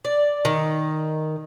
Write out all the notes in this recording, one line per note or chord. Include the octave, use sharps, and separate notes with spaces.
D5
D#3